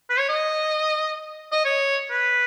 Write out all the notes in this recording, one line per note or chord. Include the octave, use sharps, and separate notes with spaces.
B4
C#5
D#5
D#5
C#5
B4